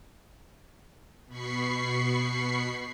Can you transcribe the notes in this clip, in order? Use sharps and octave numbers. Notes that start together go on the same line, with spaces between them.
B2 B5 C#6 C7